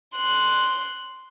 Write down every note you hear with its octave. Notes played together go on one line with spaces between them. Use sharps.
C6 F#6